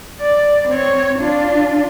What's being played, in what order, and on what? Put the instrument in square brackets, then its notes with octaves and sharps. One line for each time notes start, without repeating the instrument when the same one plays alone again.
[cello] D5
C4 C#5
D4 F4